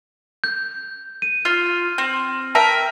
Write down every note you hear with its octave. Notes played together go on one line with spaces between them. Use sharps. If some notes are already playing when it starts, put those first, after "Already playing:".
G6
D#7
F4 F6
C4
A#4 E5 G5 A5